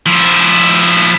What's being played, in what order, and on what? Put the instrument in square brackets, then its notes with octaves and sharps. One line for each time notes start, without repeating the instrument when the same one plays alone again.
[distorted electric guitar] F3 E4